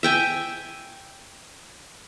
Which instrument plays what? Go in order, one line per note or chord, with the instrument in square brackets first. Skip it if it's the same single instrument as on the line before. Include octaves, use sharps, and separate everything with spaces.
[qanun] E5 G5 G#5